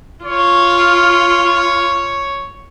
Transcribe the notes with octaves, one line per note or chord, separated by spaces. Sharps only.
F4 C#5